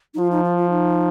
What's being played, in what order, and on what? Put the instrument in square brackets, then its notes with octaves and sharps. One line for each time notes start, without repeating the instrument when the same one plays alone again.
[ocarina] D#4
[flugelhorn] F3 [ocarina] F4
[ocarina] D#4
F4
F4
D#4